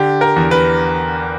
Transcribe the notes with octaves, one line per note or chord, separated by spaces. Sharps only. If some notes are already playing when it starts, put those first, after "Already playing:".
Already playing: D3 G4
A#4
E2
B4